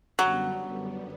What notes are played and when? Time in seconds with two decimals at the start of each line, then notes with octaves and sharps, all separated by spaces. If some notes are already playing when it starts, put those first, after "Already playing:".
0.19 F#2 D3 F#3 G3 B3